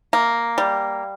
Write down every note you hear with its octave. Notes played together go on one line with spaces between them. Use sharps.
A#3
G3